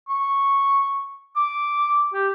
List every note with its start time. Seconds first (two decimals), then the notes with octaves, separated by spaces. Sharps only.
0.09 C#6
1.36 D6
2.14 G4